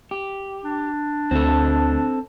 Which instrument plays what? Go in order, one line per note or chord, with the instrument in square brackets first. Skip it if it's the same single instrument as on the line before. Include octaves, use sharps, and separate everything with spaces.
[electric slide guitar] G4
[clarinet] D4
[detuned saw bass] D2 [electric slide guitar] C4 A4